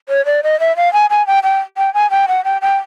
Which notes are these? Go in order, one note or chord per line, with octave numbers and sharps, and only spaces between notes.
C#5
D5
D#5
E5
F5
G#5
G#5
G5
G5
G5
G#5
G5
F#5
G5
G5